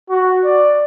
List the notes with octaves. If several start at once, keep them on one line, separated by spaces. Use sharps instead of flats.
F#4
D5